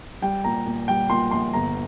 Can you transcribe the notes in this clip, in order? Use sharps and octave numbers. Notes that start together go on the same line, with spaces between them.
G3 G5
A#2 A#5
A#2
G3 G5
A#2 C6
A#1 C6
G1 A#5